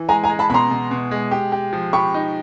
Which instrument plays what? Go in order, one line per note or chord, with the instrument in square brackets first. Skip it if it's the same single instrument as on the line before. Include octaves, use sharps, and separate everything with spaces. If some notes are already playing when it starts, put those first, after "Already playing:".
Already playing: [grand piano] E3
[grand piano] G#3 [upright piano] G#5 A#5
[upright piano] G#5 A#5
[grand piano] G#3
[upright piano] A5 B5
[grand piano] B2 [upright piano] B5
[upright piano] A#5 C6
[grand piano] B2
B2
G#3
G4
G4
F3
[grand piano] G4 [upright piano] B5 C#6
[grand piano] D#4